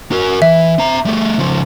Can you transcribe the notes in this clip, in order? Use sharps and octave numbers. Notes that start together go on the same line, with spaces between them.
F#4 A#4
E3 E5
C4 A#5
G3 A3
C#3 F3